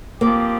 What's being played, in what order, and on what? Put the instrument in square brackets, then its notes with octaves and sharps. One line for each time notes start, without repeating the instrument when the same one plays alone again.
[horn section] F3 C4 G4 [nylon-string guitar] A#3